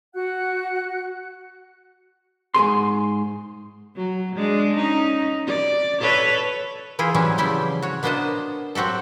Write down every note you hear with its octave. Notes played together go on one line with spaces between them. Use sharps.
F#4 F#5 F#6
G#2 B2 G#4 C6
F#3
G#3 D4
C#4 D#4
D5
A4 B4 C#5
E3 E4 F4 G#4 G5
E3 F#3 G3 C4 C#4 E4
C#3 F3 G3 E4 D5 G5
F#4 C#5
A#3 B3 D4 C5 D#5 A5
F#3 C4 F#4 G4 A4